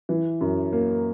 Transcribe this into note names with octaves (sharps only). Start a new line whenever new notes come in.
E3
F#2
A#3